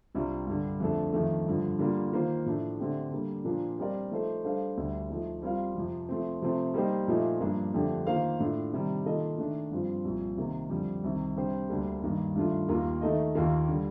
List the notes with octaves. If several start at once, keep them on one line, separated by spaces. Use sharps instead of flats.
C2 C3 G3 D4 F4
G2 D3 G3
F2 D3 A3 D4 A4
F2 D#3 A3
G2 D3 F3
D3 G3 A#3 F4
D#3 A#3 F4 C5
A2 F3 A3 D4
D3 A3 C4 G4
D3 G3 A#3
A#2 F3 A#3 D4
G3 C4 G4 A#4 D5
F3 A3 D#4 A4 C5
G3 D4 A4 C5 F5
D2 D3 G3
F3 A3 D#4
G3 C4 F4 A#4 F5
F2 C3 F3
F3 A3 C4
C3 F3 A3 C4
G3 A#3 D#4 G4 C5
A#2 F3 A3 D#4
G2 F3 A#3 D4
F2 D3 A3 D4 G4
D#3 A#3 F4 C5 F5
A2 A3 D4 F4
C3 D#3 G3
D#3 A#3 F4 A4 D#5
D#3 A3 D4
G2 F3 C4 F4
C2 A#2 F3
C3 D#3 A#3
F2 D3 G3
C2 C3 D#3
C3 G3 D4 G4 C5
D2 D3 G3 A#3 D4
G2 D#3 A#3
G2 D#3 A3 D4 F4
D#2 D#3 A#3 F4 A#4
D#3 A3 D#4 A4 D#5
D#2 D#3 A#3 F4
D3 G3